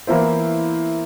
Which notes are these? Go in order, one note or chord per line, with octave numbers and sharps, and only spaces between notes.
E3 A#3 B3 E4 C5